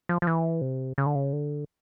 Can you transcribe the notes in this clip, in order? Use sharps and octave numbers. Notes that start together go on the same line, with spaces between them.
F3
F3
E3
C3
C#3
D3
C#3
D3